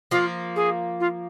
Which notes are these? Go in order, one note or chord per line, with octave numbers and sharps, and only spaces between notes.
F3 A#3 F4
G#4
F4